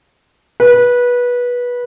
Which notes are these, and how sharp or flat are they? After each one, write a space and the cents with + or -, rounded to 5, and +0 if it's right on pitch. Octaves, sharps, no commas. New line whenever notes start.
B4 -20